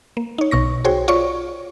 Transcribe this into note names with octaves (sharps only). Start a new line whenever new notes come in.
A#3
D#4 C#5
B1 B2 C#6 A#6
F#4 G#4 C5 C#5 G5
F4 C#5 D5 C#6